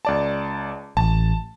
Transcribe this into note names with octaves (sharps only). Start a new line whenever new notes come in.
C#2 D5 A5
A1 A5